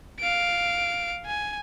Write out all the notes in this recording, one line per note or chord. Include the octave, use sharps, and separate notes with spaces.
F5 D7
G#5